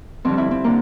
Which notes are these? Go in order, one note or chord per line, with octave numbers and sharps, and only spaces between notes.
F2 D3 G3 C4
E4
C4
D3 A#3